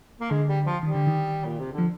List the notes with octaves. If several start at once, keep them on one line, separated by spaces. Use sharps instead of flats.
A#3
D3 G#3
G3
F3
D#3 G3
D3
D#3
A#2
C3
D3
F3